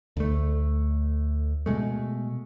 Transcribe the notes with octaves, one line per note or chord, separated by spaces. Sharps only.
D2 A3
B2 G#3 A3